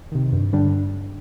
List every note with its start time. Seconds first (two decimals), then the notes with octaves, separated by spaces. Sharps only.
0.12 C3 D#3
0.32 G2
0.53 D3 G3 D4